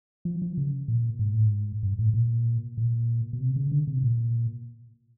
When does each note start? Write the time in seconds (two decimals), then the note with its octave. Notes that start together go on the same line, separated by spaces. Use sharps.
0.25 F3
0.42 F3
0.57 C#3
0.88 A#2
1.19 G#2
1.33 A2
1.46 G#2
1.83 G2
1.99 A2
2.14 A#2
2.78 A#2
3.33 B2
3.40 C3
3.56 C#3
3.72 D3
3.87 C3
4.03 A#2